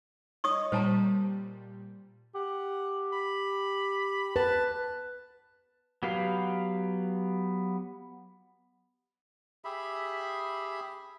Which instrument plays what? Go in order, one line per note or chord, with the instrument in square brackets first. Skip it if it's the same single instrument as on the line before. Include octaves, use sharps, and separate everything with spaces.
[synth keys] C#5 D#5 [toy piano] C#6 D#6
[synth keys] A#2 G3 [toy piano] C5 A5 A#5
[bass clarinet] G4 [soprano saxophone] F#5
[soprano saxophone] B5
[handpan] B4 [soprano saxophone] A5
[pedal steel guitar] F#3 B3 G4 B4 F5
[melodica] G4 G#4 E5 B5